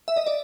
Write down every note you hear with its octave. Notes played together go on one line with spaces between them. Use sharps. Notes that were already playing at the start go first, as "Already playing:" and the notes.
E5
D#5
D5